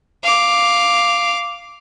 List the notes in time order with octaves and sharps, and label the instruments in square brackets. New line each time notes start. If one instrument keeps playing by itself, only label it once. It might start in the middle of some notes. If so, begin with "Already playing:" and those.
[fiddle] F5 D6